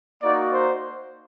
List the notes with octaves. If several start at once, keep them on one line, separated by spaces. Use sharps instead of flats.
A#3 D#4 F#4 D5
C5